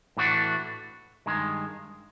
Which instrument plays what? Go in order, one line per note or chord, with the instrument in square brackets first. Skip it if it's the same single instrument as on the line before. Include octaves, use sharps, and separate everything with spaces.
[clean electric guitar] A2 E3 A3 D4 F#4
G2 D#3 G#3